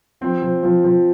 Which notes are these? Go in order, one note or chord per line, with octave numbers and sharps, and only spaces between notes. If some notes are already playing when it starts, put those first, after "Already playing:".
F3 C4
F3
F3
F3